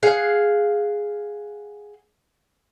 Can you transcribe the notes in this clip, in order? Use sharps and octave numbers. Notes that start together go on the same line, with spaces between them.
G#4 F5 F#5